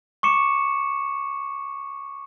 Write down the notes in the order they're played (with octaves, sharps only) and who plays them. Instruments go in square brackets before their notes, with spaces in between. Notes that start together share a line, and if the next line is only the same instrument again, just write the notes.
[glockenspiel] C#6 D6 C#7 E7